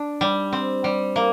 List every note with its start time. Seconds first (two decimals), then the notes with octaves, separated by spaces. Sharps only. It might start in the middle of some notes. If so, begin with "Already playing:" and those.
Already playing: D4
0.21 G3
0.53 C4
0.84 G3
1.16 A#3